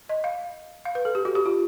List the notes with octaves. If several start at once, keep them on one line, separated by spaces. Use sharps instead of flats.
D#5
F5
F5
B4
A4
G4
F#4
G4
F4